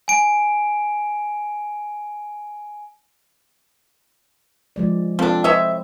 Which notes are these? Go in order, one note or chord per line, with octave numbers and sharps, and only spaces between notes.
G#5 D7
F3 G#3 D5
F3 C4 D4 A4
E4 C5 C#5 D#5 E5